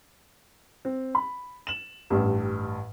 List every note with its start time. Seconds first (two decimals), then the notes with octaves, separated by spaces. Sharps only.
0.85 C4
1.15 B5
1.67 E7 F#7
2.10 A1 G2